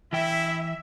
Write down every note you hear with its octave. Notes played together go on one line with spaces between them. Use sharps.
E3 E4 E5 G5